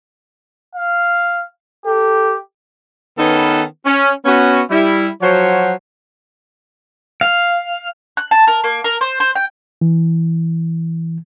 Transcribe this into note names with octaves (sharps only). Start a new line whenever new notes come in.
F5
G4 A4
D#3 B3 C#4 D#4 A4 B4
C#4
B3 C#4 F#4
G3 E4
F3 F#3 F#4 C5 C#5
F5
F#6
A5
A#4
A#3
A#4
C5
C5
G5
E3